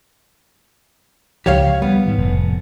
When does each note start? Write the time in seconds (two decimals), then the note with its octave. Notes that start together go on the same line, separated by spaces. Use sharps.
1.46 C#2 F3 G4 C#5 F5
1.82 G3 B3
2.06 G#2 D#3
2.18 F1 A2